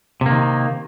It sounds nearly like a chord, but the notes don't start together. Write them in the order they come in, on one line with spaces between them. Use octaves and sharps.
C3 A#3 D#3